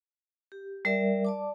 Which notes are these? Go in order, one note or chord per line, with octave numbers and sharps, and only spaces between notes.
G4
G3 A#4 D5 E5
D5 A5 D6